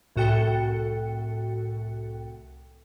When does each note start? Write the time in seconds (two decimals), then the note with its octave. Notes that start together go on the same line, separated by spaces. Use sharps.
0.16 C2 A2 F#4 A4 G5 C#7